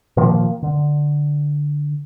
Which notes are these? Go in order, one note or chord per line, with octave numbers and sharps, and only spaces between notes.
A#2 D#3 F3 A#3
D3